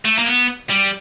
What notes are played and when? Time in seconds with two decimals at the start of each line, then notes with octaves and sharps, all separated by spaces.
0.05 A3
0.19 A#3
0.26 B3
0.70 G3